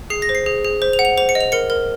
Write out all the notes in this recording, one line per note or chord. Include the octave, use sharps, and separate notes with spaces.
G#4 C7
A#6
C5
C7
G#4
G#4
C5
F7
F#5
F7
C5 F7
C#7
D#5
F7
A#4 C#7
A#4